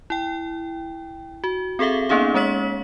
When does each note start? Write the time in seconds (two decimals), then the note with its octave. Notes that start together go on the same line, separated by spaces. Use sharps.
0.10 E4 G5
1.44 F#4
1.79 C4 G#4 A4 E5 F5
2.09 A#3 B3 C#4 D#4 G#4 F5
2.34 G#3 C#4 C#5 B6 F#7